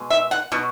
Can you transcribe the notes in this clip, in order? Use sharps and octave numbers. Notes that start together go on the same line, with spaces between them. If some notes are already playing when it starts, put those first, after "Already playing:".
Already playing: B2 G#3
E5
F#5
B2 F#3